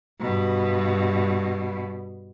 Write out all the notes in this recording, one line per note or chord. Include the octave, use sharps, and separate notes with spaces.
G2 B2